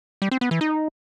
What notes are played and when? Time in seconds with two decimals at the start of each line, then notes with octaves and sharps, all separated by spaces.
0.22 G3
0.31 C4
0.41 B3
0.51 E3
0.61 D#4